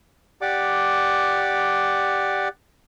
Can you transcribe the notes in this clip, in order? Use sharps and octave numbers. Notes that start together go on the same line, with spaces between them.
G4 D5 F#5 D6